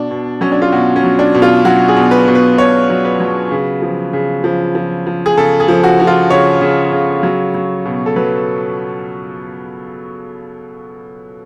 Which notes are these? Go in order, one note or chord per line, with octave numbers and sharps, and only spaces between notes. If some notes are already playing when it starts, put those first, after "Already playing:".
Already playing: B2 D4
B2
F#3 C#4
D4
F4
B2 F#4
C#4
F#3
D4
B2
F4
F#3 F#4
G#4
B2
B4
B2
B4
B2 C#5
F#3
B4
F#3
C#3
F3
C#3
F3
F3
F3
G#4
C#3 A4
G#4
F3
F#4
F3
F4
C#3 C#5
C#3
C#3
F#3
F#3
B2
A4
F#3 B4